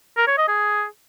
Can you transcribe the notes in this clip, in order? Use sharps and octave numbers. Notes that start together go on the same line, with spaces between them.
A#4
C#5
D#5
G#4